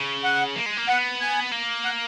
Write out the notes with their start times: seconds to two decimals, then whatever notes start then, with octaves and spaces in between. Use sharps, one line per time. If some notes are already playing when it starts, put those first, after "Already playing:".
Already playing: C#3
0.24 F#5
0.56 A#3
0.66 G#3
0.77 A#3
0.88 B3 F#5
1.20 G#5
1.52 A#3
1.85 F#5